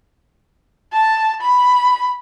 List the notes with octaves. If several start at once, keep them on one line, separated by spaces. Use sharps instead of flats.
A5
B5